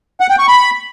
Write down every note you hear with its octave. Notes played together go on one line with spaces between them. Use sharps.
F#5
G5
C#6
B5